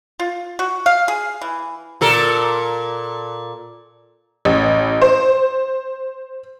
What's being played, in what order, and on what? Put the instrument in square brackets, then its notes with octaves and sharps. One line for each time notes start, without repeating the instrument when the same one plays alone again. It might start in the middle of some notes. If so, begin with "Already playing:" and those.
[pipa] F4
F#4
F5
G#4
E3
[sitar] A#2 A4 A#4
[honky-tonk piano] A1
C5